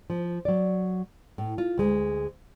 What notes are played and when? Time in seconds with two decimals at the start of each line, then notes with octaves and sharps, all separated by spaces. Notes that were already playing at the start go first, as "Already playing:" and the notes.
0.10 F3
0.45 F#3 D5
1.38 A2
1.58 F4
1.78 D2 G#3